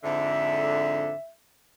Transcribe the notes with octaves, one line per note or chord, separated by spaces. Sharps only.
F2 G#2 D3 E5